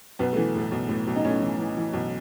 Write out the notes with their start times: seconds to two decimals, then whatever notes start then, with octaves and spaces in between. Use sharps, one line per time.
0.19 B1 B3
0.33 E3 A3
0.55 A2 A3
0.71 B1
0.89 A2
1.07 B1
1.16 D#4
1.25 A2 C#4
1.41 E3
1.59 E3
1.77 E3
1.93 B1